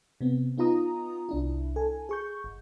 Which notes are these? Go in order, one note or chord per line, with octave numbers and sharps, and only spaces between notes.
C3 B3 C4
B3 D#4 F4 A#5 D#6
C2 D4 E4
A4 G#5
G#4 C#6 G6
G1